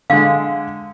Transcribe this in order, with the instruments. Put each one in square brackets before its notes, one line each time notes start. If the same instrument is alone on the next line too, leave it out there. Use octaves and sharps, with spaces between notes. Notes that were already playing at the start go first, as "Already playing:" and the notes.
[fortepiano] D3 G#3 [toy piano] F5